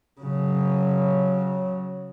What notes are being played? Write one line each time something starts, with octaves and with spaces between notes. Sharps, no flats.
C#3 F#3